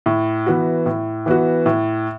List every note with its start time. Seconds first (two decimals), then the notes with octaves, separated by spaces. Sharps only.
0.06 A2
0.47 E3 B3 F#4
0.86 A2
1.26 E3 B3 F#4
1.66 A2